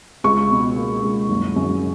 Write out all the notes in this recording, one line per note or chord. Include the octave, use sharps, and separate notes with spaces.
C#2 C#6
B2
A#3
C#2
F#1
F#2